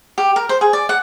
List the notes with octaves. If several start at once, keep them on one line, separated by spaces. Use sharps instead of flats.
G4
A#4
C5
G#4
D5
F#5